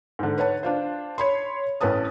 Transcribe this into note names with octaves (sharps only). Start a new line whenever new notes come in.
G#2 D3
B4 C#5 F#5 A5
D4 F4 C5
C#5 B5 C6
A1 C#4 B4 A5 D#6